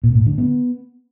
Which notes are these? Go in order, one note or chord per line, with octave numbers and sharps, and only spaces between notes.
A#2
A2
D3
B3